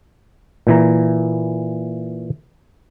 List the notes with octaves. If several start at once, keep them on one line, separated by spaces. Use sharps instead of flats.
A#2 E3 A#5